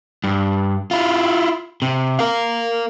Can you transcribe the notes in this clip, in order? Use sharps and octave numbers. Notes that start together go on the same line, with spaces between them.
G2
E4 F4
C3
A#4 F5